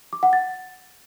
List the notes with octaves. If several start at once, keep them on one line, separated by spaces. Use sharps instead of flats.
D6
F#5
A6